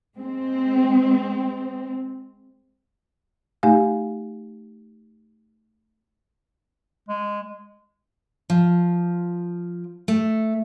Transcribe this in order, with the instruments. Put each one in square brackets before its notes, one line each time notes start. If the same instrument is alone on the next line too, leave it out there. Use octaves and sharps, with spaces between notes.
[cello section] G#3 C4
[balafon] A3 D#4 G4 F5 G#5
[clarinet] G#3
[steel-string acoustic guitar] F3
A3